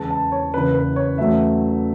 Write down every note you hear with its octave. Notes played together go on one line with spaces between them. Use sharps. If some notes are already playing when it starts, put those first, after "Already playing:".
Already playing: E2 C#3 G#3 A5
A5
C#5
F#1 E2 C#3 B4
B4
C#5
E2 C#3 F#3 A3 E5